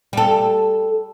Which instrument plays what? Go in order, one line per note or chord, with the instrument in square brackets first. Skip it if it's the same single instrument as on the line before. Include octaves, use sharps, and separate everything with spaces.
[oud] G3 A4